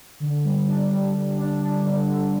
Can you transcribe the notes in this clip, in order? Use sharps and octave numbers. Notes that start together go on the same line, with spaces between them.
D3
G3
D4
G3
G3
D4
D4
D3
D3